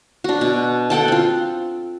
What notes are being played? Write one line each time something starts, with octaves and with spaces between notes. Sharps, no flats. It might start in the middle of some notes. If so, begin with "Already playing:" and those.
D4 F#4
B2
A4 F#5 G5 A5
C4 F4